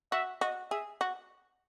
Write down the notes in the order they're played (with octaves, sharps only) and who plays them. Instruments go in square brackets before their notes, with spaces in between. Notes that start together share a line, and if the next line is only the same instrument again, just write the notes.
[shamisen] F#4 [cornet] E5
[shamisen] F#4 [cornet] D#5
[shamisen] G#4 [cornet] E5
[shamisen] F#4